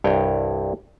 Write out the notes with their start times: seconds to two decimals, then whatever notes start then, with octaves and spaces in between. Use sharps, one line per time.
0.04 C2 G2 C#5 G5